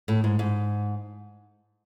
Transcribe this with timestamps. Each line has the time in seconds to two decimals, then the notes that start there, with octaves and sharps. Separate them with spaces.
0.08 A2
0.24 G#2
0.39 G#2